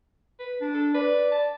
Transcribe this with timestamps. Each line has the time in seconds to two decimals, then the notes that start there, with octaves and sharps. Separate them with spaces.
0.39 B4
0.61 D4
0.74 A4
0.94 B4 D5
1.32 A5